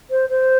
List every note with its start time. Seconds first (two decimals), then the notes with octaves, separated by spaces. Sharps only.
0.11 C5
0.29 C5